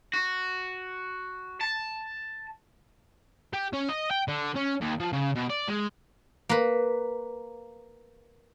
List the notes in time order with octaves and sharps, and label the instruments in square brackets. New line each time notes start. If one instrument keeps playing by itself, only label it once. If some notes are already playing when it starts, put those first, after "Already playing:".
[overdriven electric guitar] F#4
A5
[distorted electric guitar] G4
C#4
D#5
G5
D3
C#4
D#2
F3
C#3
B2
D5
G#3
[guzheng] A#3 B4